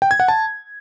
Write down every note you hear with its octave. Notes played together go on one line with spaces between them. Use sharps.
G5
G#6
F#5
A5